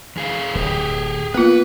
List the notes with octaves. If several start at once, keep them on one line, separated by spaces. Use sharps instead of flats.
E2 G#4 F5
D1 G4 G#4 G5
A#3 B3 F4 B4